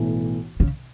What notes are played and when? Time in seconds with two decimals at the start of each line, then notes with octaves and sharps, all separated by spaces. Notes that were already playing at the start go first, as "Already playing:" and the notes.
Already playing: B1 A2 E3
0.60 C#3